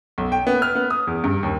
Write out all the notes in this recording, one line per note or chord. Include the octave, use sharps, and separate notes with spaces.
B1
G5
B3
F6
B3
D#6
E2
G2
D#2